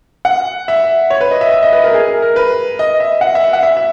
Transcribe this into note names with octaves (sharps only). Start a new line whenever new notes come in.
F#5
E5
C#5
B4
D#5
E5
E5
D#5
B4
A#4
G#4
A#4
A#4
B4
D#5
E5
F#5
E5
F#5
E5
E5